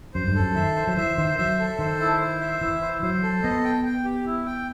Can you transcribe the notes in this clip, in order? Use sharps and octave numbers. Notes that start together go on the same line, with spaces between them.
F#2 C5
G2
F#2 A4
D#3 E5
C5
F#3
E3 E5
D#3 C5
F#3 E5
A4
D#3 C5
E4
C5
E5
E3 E4
C5
F#3 C5
A4
B3 D#5
G5
G5
G4
E4
G5